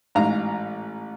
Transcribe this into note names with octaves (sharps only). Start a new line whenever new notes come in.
A1 G#2 F5 A#5